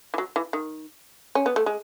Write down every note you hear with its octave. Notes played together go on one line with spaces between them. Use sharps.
E3
F#3
E3
D#3
C#4
B3
A3
G#3